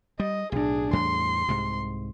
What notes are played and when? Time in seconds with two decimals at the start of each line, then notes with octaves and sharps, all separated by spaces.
0.20 G3 D#5
0.52 B1 A2 D4 G#4
0.93 E2 A2 G3 C6
1.48 C2 G#2 C3